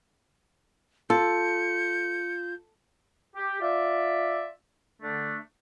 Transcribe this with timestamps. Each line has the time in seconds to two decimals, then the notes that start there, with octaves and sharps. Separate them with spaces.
1.10 F4 A4 G6 C#7
3.36 G4
3.61 F4 D5 E5
5.02 D3 A3 D4